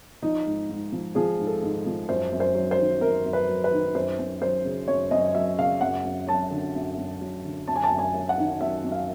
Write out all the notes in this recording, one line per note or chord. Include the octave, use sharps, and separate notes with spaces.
F3 D#4
G#2
G#2
F3
F3 G#4
G#2
A4
G#2
F3
F#2 C5
F#2
C5
F#3
C5
D#3
F#2 A#4
F#2
B4
F#3
B4
D#3
F#2 C5
F#2
F#3 C5
C#3
F#2 C#5
F#2 D#5
F#3 E5
C#3 F5
F#2 F#5
F#2
F#3 A5
D3
F#2
F#2
F#3
D3
F#2 A5
G#5
A5
F#2
G#5
F#3
F#5
D#3
F#2 E5
F#2
F5